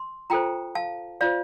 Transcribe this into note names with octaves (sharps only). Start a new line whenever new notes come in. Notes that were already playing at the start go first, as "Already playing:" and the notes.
Already playing: C6
F4 A4 C5 G5 A#5
F5 A5
F4 C5 D5 F5